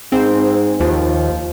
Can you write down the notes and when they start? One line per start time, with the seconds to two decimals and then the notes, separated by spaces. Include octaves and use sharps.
0.12 G#2 C4
0.80 D#2 F3